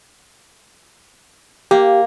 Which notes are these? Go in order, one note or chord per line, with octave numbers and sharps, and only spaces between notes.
A#3 G4